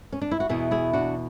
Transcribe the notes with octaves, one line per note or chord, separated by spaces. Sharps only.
C#4
D4
E4
F#4
E2 B2 E4 G#4
E4 G#4
D4 F#4